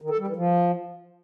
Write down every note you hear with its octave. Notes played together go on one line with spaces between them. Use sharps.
D#3
A4
G3
E3
F3